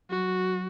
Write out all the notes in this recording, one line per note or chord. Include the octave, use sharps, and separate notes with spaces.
F#3 F#4